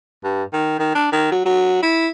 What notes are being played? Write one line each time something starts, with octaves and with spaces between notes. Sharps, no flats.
G2
D#3
D#3
D4
D#3
F#3
F#3
E4